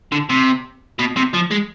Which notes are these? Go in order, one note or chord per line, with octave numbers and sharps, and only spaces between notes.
D3
C3
B2
C3
F3
G#3